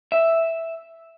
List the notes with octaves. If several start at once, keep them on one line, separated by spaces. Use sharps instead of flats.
E5